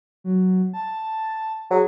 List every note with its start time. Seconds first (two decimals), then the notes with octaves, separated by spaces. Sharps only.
0.24 F#3
0.73 A5
1.71 F#3 G#4